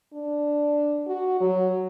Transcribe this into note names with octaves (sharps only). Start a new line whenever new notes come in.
D4
F#4
F#3